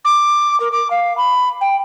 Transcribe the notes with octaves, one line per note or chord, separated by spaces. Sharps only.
D6
A#4
D6
F5
B5
G5